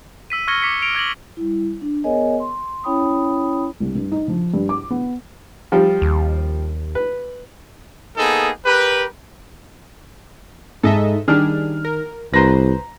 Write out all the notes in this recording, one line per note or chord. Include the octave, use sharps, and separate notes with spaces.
E6 B6 D#7
C#6 F6 G#6 A#6 C#7 G7
D6 B6 C#7
D7 F7
F6 G#6 A#6 F7 F#7
G3 E4
D4
B3 G#4 A#4 C#5 D#5 G#5
C6
C#4 E4 C#5 G5 B5 D#6
C2
G2
D#4
F3
G2
D6
B3
F3 G3
D#2
B4
A#3 B3 D#4 G#4 A4
G4 A#4 B4
G#2 A4 D#5 E5
D#3 G3 D4 G#4 F6
A#4
C2 B4 C5 A#5 A#6